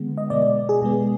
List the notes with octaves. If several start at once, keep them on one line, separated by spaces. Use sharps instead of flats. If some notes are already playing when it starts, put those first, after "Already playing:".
Already playing: D3 G#3 B3
D#5
B2 G#3 B3 D5
G#4
B2 G#3 B3